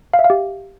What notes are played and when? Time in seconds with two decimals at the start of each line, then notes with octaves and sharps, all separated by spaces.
0.13 F5
0.19 E5
0.24 F5
0.30 G4